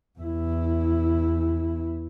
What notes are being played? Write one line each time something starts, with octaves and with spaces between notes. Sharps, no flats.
E2 E4